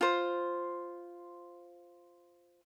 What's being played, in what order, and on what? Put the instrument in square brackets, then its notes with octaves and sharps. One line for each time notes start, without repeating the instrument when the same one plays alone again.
[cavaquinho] F4 C5